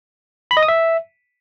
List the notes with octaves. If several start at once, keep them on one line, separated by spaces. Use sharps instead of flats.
B5
D#5
D#6
E5